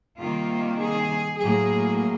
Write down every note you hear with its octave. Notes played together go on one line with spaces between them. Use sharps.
C3 D#3 G3 A#3 F4
G#4
A2 F#3 A#3 G#4